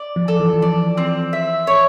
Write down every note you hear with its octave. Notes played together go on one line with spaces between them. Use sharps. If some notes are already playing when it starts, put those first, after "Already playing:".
Already playing: D5
F3
A4
E3
E3
F3 D5
C4
E5
C#5